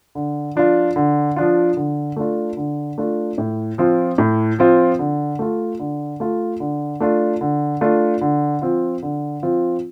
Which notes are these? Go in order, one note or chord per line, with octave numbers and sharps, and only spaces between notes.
D3
F3 D4 F4
D3
F3 D4 F4
D3
A3 D4 F4
D3
A3 D4 F4
A2
F3 C4 F4
A2
F3 C4 F4
D3
A3 F4
D3
A3 F4
D3
A3 D4 F4
D3
A3 D4 F4
D3
F3 C4 F4
D3
F3 C4 F4